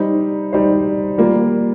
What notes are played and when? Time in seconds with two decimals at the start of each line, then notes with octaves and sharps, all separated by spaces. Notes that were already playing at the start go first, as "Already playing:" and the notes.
Already playing: G3 D#4 C5
0.53 G3 D#4 C5
1.18 G3 A#3 F4